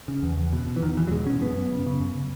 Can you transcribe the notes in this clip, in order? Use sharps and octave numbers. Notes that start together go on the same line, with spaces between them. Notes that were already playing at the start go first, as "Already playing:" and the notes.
C#3
E2
E2
B2
B2
E3
E2 D#3
E2 E3
F#3
B2 G#3
B2 C#4
F#2 B3
F#2
C#3
C#3
F#2